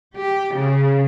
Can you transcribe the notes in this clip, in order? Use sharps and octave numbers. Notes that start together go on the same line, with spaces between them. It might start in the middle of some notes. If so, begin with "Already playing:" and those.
G4
C#3